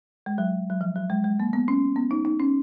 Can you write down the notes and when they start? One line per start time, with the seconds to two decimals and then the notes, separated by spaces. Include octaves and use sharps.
0.26 G#3
0.38 F#3
0.70 F#3
0.81 F3
0.96 F#3
1.10 G#3
1.24 G#3
1.40 A#3
1.53 B3
1.68 C#4
1.96 B3
2.11 D#4
2.25 D#4
2.40 C#4